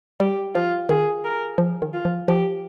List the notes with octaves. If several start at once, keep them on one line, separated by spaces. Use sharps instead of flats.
G3 G4
F3 F4
D#3 G#4
A#4
F3
D#3
F4
F3
F3 G4